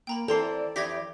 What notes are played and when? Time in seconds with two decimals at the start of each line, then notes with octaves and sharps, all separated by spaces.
0.07 A#3 G5 A#5 B5
0.28 E3 C4 A4 D5 A#5 C6 C7
0.76 F2 E3 G4 G#6 A#6 B6